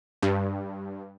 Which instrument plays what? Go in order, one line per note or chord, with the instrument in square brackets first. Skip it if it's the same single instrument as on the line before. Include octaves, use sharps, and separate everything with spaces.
[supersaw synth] G2